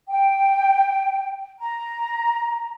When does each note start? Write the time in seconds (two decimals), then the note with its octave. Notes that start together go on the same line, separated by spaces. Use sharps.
0.09 G5
1.59 A#5